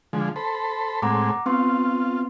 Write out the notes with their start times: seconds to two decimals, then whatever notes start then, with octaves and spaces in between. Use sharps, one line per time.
0.13 D3 F3 G#3
0.36 A4 C5 B5
1.02 A2 G#3 C4 F#5 A#5 D6
1.46 B3 C4 F4 C6